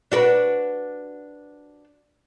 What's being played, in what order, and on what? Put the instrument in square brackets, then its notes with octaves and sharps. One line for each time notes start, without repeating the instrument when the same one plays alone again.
[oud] D4 F#4 B4